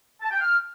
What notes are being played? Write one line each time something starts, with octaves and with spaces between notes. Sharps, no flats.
A5
G5
F6